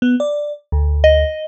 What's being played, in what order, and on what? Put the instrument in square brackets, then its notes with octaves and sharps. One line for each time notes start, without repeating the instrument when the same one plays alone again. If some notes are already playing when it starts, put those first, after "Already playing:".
[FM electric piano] B3
D5
D2
[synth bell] D#5